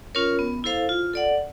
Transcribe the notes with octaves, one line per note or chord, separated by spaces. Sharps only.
C#4 F4 A#4 C#5
B3
E4 A4 C5 F5
F4
A4 D5 F#5